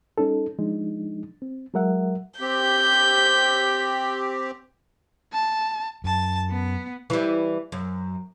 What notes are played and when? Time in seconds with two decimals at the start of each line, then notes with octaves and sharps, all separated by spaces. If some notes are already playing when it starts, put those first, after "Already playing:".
0.18 G3 C#4 D#4 A4
0.59 F3 G#3 D4 D#4
1.42 C4
1.74 F#3 G#3 A#4 E5 F#5
2.41 C4 G4 G6 B6
5.33 A5
6.04 F#2 A5
6.50 B3
7.10 E3 G3
7.72 F#2